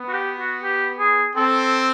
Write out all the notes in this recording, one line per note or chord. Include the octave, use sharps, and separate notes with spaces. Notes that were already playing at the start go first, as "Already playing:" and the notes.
Already playing: B3
F#4
G4
F#4
G4
G#4
C4 A4